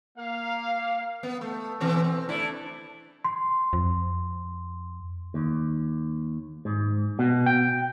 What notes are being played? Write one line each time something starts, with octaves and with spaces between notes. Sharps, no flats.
A#3 F5
B3
A3
B2 E3 C4
C4
A3 D4 E4
C6
F2
D#2
G#2
B2
G5